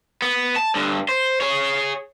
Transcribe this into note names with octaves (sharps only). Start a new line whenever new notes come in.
B3
A5
G2 D3
C5
G#4 C#5